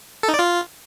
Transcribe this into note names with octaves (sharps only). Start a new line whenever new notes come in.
A4
D#4
D5
F4